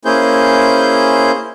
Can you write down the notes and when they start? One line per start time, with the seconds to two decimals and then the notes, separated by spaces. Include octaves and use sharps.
0.05 A#3 C#4 E4 G#4 C5 G6